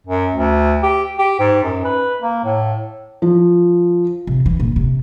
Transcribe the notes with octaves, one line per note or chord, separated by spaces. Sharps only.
F#2
D2
G4
G4
G#2
F#2
B4
A#3
A2
F3
C3
E3
A#2
C3